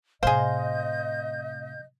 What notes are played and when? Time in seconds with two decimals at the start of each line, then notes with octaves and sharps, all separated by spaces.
0.23 A2 C3 G#4 C5 D#5 F5 G6